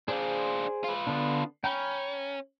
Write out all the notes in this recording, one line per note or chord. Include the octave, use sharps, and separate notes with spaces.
D4 F4 G#4 C5 D5
F4 B4
D3 B3 D4
C#4 G5 A#5 B5